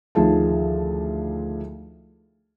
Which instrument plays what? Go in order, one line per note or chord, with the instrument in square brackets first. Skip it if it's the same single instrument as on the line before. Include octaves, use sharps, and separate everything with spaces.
[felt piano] D2 D#3 F3 F4 G#4 A5